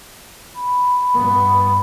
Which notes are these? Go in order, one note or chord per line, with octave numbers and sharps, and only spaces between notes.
B5
G2 B3